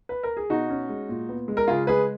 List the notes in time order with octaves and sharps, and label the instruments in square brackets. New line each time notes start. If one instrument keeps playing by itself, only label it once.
[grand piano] B4
A#4
G#4
B2 D#4 F#4
C#4
G#3
A#2
B3
G#3
A#4
C#3 F4 G#4
G#3 G#4 B4